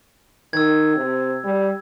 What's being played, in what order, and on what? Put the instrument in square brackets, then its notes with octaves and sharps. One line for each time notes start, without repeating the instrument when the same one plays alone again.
[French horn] D#3 [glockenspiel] E6 G#6
[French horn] C3
G3